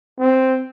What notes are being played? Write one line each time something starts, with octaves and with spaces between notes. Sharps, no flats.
C4